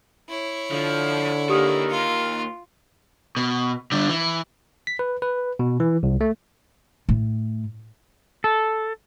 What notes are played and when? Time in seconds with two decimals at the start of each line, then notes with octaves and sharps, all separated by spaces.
0.29 E4 C#5
0.71 D3 F3
1.49 D#3 A#3 G4 D#6
1.89 F4 C#7
3.37 B2
3.92 D3 G3
4.09 E3
4.87 B6
4.99 B4
5.22 B4
5.59 B2
5.80 E3
6.03 C2
6.21 A3
7.09 A2
8.44 A4